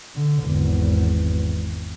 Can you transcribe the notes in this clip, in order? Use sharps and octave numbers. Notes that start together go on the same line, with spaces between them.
D3
G#1 E2